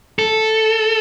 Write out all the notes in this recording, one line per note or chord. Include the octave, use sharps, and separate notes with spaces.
A4